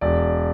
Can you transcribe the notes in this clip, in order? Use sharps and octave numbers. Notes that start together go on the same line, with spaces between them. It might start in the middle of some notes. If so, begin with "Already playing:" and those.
E1 D5